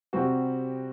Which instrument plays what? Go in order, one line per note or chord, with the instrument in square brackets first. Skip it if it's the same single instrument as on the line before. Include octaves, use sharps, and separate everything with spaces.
[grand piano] C3 G3 C4 F#4